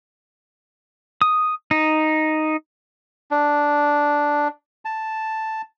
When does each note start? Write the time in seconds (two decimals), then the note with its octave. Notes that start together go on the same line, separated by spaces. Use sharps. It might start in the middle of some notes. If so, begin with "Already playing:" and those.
1.22 D#6
1.71 D#4
3.31 D4
4.85 A5